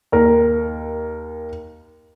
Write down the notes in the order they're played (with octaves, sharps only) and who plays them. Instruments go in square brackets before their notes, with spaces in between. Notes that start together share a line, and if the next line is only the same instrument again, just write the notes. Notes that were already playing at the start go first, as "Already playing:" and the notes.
[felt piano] D#2 A#4